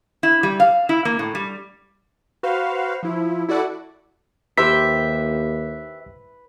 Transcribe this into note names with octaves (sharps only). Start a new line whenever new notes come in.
E4
G3
F5
E4
A#3
A2
G3
F#4 B4 C5 F5
F3 E4
E4 F#4 A4 D5 F#5
D#2 G4 B4 C5 E5 B6